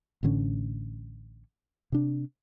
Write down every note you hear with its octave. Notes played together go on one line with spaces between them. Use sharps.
A1 A2 D3 C#4
C3 D4